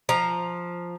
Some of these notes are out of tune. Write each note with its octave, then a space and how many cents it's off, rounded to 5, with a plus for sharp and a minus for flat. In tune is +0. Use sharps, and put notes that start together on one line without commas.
F3 +0 A#5 +0